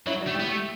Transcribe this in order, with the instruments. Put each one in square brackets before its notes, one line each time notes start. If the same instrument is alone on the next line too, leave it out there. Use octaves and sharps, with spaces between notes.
[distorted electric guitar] F#3 [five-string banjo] C#4 E4
[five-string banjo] D4 F#4
[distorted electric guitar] A3
[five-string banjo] E4 G4
[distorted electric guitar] B3
A3